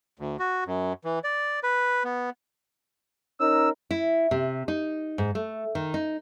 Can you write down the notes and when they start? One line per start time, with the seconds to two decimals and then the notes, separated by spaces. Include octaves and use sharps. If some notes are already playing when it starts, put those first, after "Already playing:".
0.19 D2
0.39 F#4
0.66 F#2
1.04 E3
1.24 D5
1.63 B4
2.04 B3
3.40 C#4 D#4 A#4 E6
3.91 E4
4.31 C3
4.68 D#4
5.18 G#2
5.35 A3
5.75 D#3
5.94 D#4